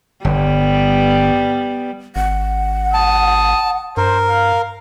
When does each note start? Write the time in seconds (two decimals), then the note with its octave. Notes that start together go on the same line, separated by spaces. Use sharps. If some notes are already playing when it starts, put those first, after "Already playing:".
0.25 G1 G3 B3
2.16 G#1 F#5
2.94 A5 D#6
3.97 G2 A#4 C5
4.29 F5